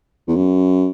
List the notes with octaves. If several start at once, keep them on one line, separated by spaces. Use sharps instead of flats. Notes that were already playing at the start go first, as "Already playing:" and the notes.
E2
F#2